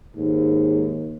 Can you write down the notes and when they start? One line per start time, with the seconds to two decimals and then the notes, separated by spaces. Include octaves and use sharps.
0.16 D#2 G#2